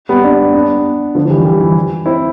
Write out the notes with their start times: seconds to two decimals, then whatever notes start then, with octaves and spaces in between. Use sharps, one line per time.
0.09 G3 B3
0.24 B3 D4
0.54 B3 D4
1.15 D3 F3
1.25 F3
1.30 E3 G3
1.45 E3 G3
1.60 E3 G3
2.06 C4 E4